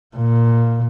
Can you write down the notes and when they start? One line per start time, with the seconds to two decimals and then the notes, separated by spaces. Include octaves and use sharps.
0.16 A#2